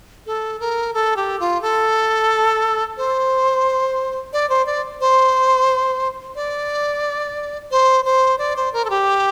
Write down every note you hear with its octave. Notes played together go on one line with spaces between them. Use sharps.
A4
A#4
A4
G4
F4
A4
C5
D5
C5
D5
C5
D5
C5
C5
D5
C5
A#4
A4
G4